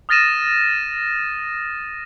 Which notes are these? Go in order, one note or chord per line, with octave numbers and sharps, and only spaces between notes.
D#6 F6 A6 A#6 D#7 E7